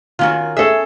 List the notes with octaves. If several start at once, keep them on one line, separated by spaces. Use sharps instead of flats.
D#3 C#4 F4 F#4 F6
C#4 G#4 A4 E5